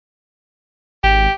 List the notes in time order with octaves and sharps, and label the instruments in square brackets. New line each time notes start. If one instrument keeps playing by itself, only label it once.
[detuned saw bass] G#1 [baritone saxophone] G4